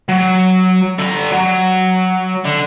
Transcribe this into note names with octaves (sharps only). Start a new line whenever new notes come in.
F#3
D3 A#5
F#3
D3